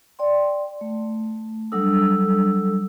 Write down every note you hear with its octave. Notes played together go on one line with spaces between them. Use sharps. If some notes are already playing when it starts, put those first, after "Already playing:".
D5 G5 C6
A3
F#3 G3 D4 A4 D#6 E6